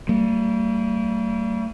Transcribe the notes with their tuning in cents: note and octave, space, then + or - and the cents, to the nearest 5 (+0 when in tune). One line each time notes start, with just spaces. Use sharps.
G3 -20 A#3 -45